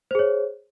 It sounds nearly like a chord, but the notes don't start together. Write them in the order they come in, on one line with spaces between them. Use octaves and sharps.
C5 G#4 C#5